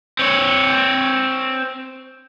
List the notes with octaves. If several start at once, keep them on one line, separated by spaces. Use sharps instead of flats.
C4 C#5